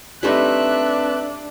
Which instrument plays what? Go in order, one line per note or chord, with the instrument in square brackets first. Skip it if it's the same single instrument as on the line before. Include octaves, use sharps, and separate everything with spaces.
[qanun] G3 A3 D#4 [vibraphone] C4 B4 [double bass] D4 [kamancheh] E5 F#6